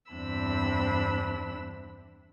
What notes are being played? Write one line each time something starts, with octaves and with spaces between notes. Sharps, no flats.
E2 G2 C4 D4 B5 E6